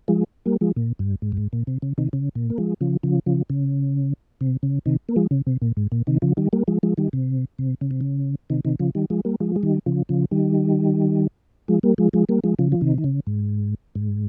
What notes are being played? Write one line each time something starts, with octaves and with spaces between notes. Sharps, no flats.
F3 G#3
G3 A#3
F3 G#3
A#2
G2
G#2
G2
G#2
A#2
C3
C#3
C3 D#3
C#3
A#2
A#3
F3 G#3
C#3 F3
C#3 F3
C#3 F3
C#3
C3
C#3
C3 D#3
A#3
F3 G#3
C#3
C3
A#2
G#2
A#2
C3 D#3
C#3 F3
D#3 G3
G3 A#3
F3 G#3
F3 G#3
D#3 G3
C3
C3
C#3
C3
C#3
C3 D#3
C3 D#3
C#3 F3
D#3 G3
F3 G#3
G3 A#3
F3 G#3
G#3
D#3 G3
C#3 F3
C#3 F3
D#3 G3
F3 G#3
G3 A#3
F3 G#3
F3 G#3
G3 A#3
F3 G#3
C#3 F3
F3
C3 D#3
D#3
C#3
G#2
G#2